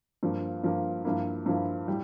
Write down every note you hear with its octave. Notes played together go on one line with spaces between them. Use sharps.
G2 F3 A#3
G2 F3 A#3
G2 F3 A#3 E4
G2 F3 A#3 E4
A2 G3